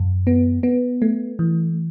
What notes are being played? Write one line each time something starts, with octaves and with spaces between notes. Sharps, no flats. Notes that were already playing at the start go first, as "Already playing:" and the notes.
Already playing: F#2
B3
B3
A3
E3